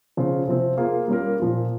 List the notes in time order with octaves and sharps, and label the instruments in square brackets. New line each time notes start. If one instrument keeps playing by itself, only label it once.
[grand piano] C#3 F3 C4 F4
C3 F3 C4
A#3 F4 G#4
G3 A#3 C#4 F4 A#4
A#2 F3 A#3 F4